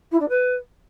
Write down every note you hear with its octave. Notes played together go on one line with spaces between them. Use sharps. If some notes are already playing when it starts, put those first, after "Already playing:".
E4
D4
B4